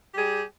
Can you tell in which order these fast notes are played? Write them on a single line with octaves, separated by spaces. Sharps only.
G4 G3 G#4